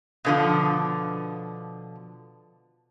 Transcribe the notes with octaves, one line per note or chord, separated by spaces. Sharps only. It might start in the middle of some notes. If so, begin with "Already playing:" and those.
B2 D3 F3